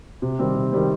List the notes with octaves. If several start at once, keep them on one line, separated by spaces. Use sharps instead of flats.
C3
D#3 G3 C4
C3
D#3 G3 C4